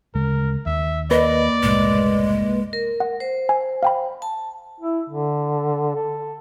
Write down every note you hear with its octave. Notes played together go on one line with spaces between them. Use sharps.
D2 C#3 G#3 A#4
D#2 E5
A#3 B4 D5 D#5
F#1 C2 A2 G#3
A#4
F#5
C5
G#5
F5 G5 B5
A5
E4
D3
A4